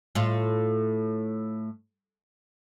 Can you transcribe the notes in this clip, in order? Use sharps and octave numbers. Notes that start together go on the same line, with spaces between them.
A2 F4